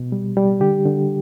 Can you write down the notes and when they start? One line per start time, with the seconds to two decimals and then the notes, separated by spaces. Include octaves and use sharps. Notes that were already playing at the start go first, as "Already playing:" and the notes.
Already playing: B2
0.12 G3
0.37 G3
0.60 D3 G4
0.85 D3